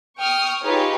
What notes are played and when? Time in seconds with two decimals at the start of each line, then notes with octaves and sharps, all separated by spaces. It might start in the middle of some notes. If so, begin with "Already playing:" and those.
0.19 G5 C#6 D#6 F6
0.63 D#4 F4 G4 G#4 B4 C#5